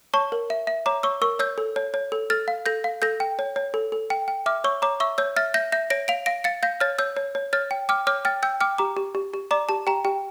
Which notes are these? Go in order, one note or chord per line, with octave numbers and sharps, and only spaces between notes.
C#5 A5 C#6
A#4
E5
E5
C#5 A#5 D6
C#5 C#6 E6
A#4 C#6 E6
C#5 E6 G6
A4
C#5
C#5
A4
A4 F6 A6
F5
A4 G6 A#6
F5
A4 G6 A#6
G5
C#5
C#5
A4
A4
G5
G5
E5 D6 F6
C#5 C#6 E6
C#5 A#5 D6
E5 C#6 E6
C#5 E6 G6
E5 F6 A6
E5 G6 A#6
E5 G6 A#6
C#5 A#6 D7
F5 D7 F7
F5 A#6 D7
F5 A6 C#7
F5 G6 A#6
C#5 F6 A6
C#5 E6 G6
C#5
C#5
C#5 F6 A6
G5
G5 D6 F6
C#5 D6 F6
G5 F6 A6
G5 E6 G6
G5 D6 F6
G4 A#5 D6
G4
G4
G4
D5 A#5 D6
G4 A5
G4 G5 A#5
G4 G5